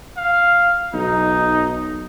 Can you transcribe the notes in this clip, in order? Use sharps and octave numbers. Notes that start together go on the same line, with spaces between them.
F5
B1 D#4